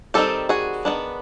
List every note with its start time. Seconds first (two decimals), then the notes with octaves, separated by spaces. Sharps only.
0.14 D#3 G3 C4 D#4 G4 A4
0.49 F#4 G#4
0.85 D#3 G#3 B3 D4